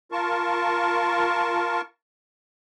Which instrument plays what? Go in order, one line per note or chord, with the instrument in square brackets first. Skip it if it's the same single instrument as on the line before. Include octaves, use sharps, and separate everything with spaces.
[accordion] F4 A#4 A5 C#6